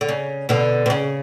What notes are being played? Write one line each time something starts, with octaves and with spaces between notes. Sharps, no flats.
D3
C#3
B2 D3
B2
C#3